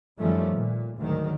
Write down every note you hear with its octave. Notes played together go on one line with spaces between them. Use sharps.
F#2 D#3 F3 G3 A3 C#4
A#2
D2 G#2 D#3 F#3